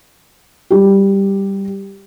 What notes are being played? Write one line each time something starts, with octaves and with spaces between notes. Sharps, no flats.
G3 G4